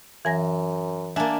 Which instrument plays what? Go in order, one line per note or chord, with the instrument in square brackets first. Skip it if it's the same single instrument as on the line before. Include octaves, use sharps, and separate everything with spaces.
[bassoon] F#2 [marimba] E3 G#5 A#6
[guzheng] A#3 D4 [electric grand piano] E5 G#5 A5